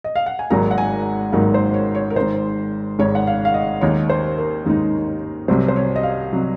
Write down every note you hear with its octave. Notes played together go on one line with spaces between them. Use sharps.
D#5
F5
F#5
G#5
G#1 G#2 F#3 A#3 D#4 A#5
F#5
G#5
G#1 G#2 F#3 A#3 D#4
C5
C#5
C#5
A#4
G#1 G#2 D#3 C5
G#1 G#2 D#3 C#5
F#5
F5
F5
D#5
D#2 D#3 G#3 D#4 C#5
C5
A#4
D#2 D#3 G#3 D#4
C2 C3 F#3 C5
C5
C#5
D#5
F5
C3 F#3